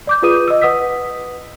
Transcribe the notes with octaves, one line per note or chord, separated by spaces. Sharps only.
D5 D6 G6
F4 G#4 B4 D#6 D#7
D#5 E6
B4 F#5 D#6 E6 B6